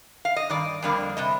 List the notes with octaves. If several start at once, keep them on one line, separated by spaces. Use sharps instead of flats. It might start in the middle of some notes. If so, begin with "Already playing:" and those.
F5
D#5
G2 D#3 D5
F2 D3 G3 A#3
C3 G3 D#5